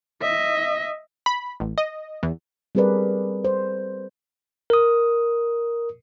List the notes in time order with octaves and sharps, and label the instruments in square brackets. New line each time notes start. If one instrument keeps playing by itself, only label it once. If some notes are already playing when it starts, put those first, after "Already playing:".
[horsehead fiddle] D#5 E5
[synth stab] B5
A1
D#5
E2
[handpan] G3 C4 G#4 A#4 B4 D5
C5
[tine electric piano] A#4 D#6